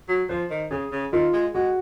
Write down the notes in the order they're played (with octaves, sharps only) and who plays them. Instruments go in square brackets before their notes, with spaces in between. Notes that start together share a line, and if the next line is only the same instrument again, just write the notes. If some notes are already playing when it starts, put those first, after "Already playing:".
[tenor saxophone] F#3
[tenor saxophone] F3 [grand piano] C5
[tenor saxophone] D#3
[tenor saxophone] C#3 [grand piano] G#4
[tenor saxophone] C#3
[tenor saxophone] D#3 [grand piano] F4
[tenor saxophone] G#3
[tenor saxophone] G#3 [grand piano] F#4